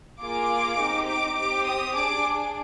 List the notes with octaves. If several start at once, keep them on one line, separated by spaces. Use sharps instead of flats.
A#3 F4 G#4 D6
C4 D#4 G4
D6
C4 G4 D6
D#6
D4 G#4 D6